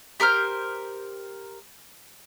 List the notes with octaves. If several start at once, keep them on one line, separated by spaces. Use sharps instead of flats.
G4 A#4 C5 F6